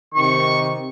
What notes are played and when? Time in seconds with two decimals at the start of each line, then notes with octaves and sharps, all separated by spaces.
0.14 C3 D#3 C#6